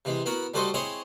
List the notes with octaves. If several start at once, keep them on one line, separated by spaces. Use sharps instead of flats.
C3 E3 G#3
B3 E4 F#4 A#4
G3 A3 F#4 A4 C5 D#5
G#3 C4 E4 C#5 D#5